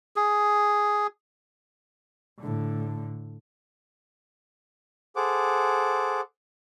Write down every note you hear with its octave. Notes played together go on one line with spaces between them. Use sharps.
G#4
A2 D3
G#4 A4 C5 F#5 D6